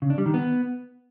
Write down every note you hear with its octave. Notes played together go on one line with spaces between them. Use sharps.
C#3
D4
G3
D#3
B3